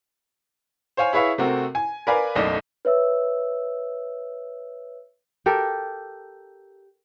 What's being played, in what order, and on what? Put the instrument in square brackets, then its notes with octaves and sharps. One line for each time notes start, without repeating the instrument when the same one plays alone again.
[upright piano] C5 C#5 F5 G#5
E4 G#4 B4 C#5 E5 F5
C3 A3 C4 F#4 A#4
G#5
A#4 B4 D5 F5 G#5
F#1 B1 A3 D5 D#5 A#6
[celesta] B4 C#5 E5 E6
[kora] G4 A4 A#4